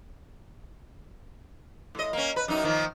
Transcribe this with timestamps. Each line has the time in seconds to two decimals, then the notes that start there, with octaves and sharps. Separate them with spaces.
1.95 A2 D#5
2.13 A#3 C#4
2.36 B4
2.48 F#2 D#4
2.63 D#3 F3 A#3